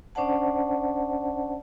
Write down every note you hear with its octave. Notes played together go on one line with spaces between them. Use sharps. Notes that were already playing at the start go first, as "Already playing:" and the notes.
C#4 D4 C5 D5 F#5 A5